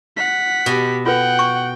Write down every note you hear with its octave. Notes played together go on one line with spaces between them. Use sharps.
F#5 B6
B2 G4
F4 A4 B4 F#5 G5
C#6